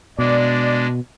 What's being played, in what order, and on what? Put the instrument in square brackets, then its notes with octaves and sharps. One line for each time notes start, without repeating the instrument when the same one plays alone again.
[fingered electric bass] B2 [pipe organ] G#3 D4 [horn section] D5